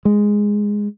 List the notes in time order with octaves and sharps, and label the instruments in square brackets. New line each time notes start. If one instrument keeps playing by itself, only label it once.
[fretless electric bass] G#3